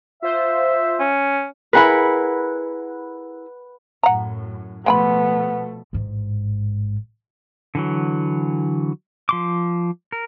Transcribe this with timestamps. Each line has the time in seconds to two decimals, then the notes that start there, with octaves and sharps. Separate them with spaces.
0.22 F4 C5 E5
1.00 C#4
1.73 E4 G#4 A#4 B4 F#5 B5
4.03 F#2 A2 F#5 A#5
4.86 B2 F3 G#3 A3 B3 G5 B5
5.93 A1 G#2
7.75 D3 E3 F#3
9.29 F3 C6 D6
10.12 A#4